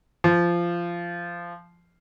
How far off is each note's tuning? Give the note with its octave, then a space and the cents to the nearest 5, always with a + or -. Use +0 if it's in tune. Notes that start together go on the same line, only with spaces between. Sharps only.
F3 -15